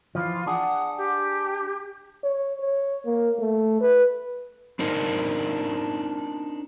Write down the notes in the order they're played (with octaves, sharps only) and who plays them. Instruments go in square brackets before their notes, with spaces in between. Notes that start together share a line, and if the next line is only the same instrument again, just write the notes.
[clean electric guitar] E3 F3 [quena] F4
[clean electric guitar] D4 G#4 [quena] F#5
[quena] G4
[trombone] C#5
C#5
A#3
A3
B4
[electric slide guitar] C4 D4 D#4 A#4